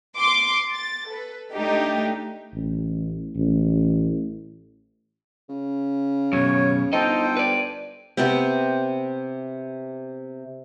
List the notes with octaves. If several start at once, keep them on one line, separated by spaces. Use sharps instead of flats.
C6 D6
A6
A4 B4
A3 D4 D#4 G4
A1
A1
C#3
F#2 B2 C#5
G1 D#4 A4 C5 D#5 G5
B4 D5
C3 B3 C4